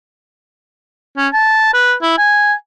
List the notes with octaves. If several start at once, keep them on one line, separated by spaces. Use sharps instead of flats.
C#4
A5
B4
E4
G#5